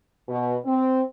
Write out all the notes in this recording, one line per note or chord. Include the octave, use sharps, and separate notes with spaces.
B2
C4